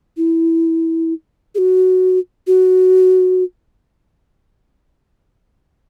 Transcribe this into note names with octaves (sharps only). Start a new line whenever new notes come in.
E4
G#4
F#4
F#4